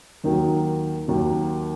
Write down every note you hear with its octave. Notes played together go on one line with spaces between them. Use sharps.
D#2 D#3 F#3
D#2 D#3 F#3